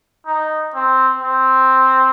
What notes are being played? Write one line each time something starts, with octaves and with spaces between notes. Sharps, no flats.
D#4
C4
C4